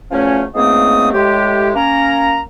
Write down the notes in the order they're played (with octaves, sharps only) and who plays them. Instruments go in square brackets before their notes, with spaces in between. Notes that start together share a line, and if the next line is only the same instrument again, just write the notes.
[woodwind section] E2 F3 A3 C#4
C#2 G#2 A3 A#3 C4 D#6
A2 G#3 G4
A#3 C#4 A#5